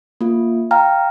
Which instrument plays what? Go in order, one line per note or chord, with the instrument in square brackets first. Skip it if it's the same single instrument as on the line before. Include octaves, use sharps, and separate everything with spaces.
[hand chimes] A#3 F4
F5 G5 A#5 F6